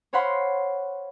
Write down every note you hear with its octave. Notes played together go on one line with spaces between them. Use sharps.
C5 C#5 F5 F#5 B5 C6